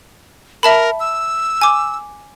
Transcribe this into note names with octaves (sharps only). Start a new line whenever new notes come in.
A#4 E5 A5 B5
E6
G#5 D6